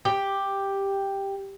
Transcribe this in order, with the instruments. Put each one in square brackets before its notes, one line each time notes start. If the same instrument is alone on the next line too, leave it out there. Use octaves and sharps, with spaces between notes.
[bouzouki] G4